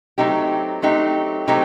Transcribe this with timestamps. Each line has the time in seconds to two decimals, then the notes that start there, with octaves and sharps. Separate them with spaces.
0.18 F#3 A3 C4 D#4 G4
0.82 F#3 A3 C4 D#4 G4
1.48 F#3 A3 C4 D#4 G4